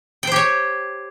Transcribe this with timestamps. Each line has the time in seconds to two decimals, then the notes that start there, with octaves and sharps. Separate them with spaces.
0.23 G5
0.27 C5
0.32 G4
0.36 C#5